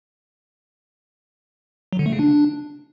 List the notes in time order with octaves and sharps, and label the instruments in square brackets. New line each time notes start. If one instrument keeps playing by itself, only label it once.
[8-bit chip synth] F#3
D3
A3
C#3
D4